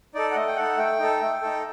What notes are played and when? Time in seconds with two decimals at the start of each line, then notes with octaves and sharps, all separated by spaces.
0.14 D#4 A4 D5
0.31 F#5
0.35 A3 D#5
0.47 G5
0.57 D#4 A4 F#5
0.78 A3 G5
0.99 D#4 A4
1.21 A3
1.42 D#4 A4